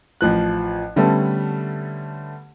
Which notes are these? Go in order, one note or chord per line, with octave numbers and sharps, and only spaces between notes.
A1 F3 F#6
D3 G3 A3 B3 C#4 A4